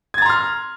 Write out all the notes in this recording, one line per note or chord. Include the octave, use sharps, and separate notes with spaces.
A#5 C6 F6 G#6 A6